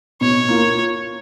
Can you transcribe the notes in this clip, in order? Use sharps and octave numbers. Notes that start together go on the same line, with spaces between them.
B2 C#5
A#3 F4